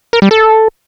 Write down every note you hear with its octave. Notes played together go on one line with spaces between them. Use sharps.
A#4
G3
A4